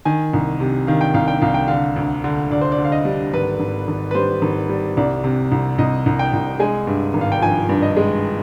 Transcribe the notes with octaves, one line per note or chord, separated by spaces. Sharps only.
D#3 G#5
C2
C3
D#3 F5
G5
C2 F5
G5
C2 F5
G5
D3 F5
D2
D3
D2 D5
C5
D5
D3
F5
D#5
G3
G#1 B4
G#1
G#1
B4
G3 C5
G#1
G3
C2 D5
C3
C2
C2 D#5
C2
G5
C2
G#3 G#5
G2
G#1
F5
G5
F3 G#5
G2
D#5
G#3